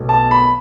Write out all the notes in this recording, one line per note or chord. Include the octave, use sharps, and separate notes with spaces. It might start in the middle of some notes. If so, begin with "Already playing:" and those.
Already playing: B1 B2 A3
A5
B5